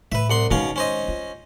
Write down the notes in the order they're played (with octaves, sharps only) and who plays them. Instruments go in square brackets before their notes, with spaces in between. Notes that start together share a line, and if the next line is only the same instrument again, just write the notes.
[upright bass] A2 [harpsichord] B4 E5
[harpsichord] C2 F#5 C6
[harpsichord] B2 C#4 F5 [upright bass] D#3 G#3
[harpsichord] C#4 C5 D#5
[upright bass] F4